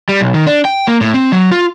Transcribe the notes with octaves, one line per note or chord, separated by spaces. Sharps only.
G3
B1
D#3
D4
G5
A#3
A2
C4
F#3
F4